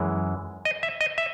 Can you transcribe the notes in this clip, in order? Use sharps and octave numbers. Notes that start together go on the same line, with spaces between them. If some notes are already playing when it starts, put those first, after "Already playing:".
Already playing: F#2 E3 G#3
D#5
E5
D#5
E5